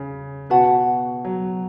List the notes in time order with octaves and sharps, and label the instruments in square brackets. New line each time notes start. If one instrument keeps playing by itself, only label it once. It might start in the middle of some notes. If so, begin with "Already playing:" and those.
Already playing: [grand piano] C#3
[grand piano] B2 [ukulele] F#4 B4 F#5 A5
[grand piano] F#3